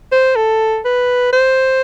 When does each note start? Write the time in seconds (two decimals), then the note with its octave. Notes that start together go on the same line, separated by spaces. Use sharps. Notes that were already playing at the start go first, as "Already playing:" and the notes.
0.12 C5
0.36 A4
0.85 B4
1.33 C5